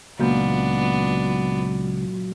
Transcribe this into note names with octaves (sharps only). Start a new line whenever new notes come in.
C#2 A#2 F#3 B3 D4 A#4 G6